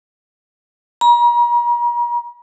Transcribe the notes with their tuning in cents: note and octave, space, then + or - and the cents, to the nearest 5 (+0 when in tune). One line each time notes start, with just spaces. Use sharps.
A#5 +40